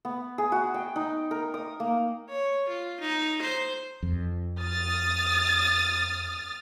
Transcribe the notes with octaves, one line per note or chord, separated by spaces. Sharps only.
B3
G#4
F#4
G5
D#4
A#4
D#6
A#3
C#5
F4
D#4
C5
F2
D#6 F6 A6